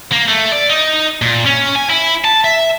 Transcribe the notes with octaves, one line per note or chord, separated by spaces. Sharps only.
A#3
A3
D5
D#4
A#2
C#4
G#5
E4
A5
E5